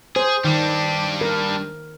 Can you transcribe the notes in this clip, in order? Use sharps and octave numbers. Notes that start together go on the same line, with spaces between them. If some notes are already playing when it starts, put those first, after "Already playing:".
G#4 C5
D#3 G3 D4
A#4